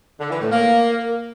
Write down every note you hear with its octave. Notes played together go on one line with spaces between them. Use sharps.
D3
E3
A2
A#3